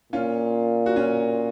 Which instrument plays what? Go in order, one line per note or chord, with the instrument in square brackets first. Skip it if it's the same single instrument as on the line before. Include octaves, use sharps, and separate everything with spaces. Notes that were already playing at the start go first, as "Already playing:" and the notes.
[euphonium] A#2 [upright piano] C#4 F4
[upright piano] F#4
C#4 F4